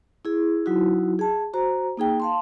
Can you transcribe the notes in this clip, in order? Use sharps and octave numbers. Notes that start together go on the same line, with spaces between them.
E4 G#4
F#3 D#4 E4 F#4
G#4 A5
F#4 C5 A#5
A#3 D#4 G#4 G5
F5 A5 C6